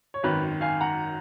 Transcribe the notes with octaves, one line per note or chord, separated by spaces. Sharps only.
C#5
G#1 F#2 D#3 B4
F5 G#5
F#5 A#5